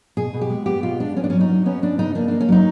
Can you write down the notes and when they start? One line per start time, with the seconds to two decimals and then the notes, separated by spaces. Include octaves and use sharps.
0.17 B2 G#4
0.34 B2
0.41 G4
0.50 G#3
0.66 B3 G4
0.83 B2 F4
1.00 G#3 D4
1.16 B3 C#4
1.24 D4
1.30 F#3 C#4
1.41 D#4
1.49 F#3
1.66 B3 C#4
1.82 B3 D4
1.98 C#3 D#4
2.15 A#3 D4
2.28 A#3 D4
2.41 C#4
2.48 F#3 D#4